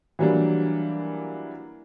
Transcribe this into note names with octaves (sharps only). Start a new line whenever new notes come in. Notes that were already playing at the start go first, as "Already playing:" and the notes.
E3 F#3 G3 A#3 D4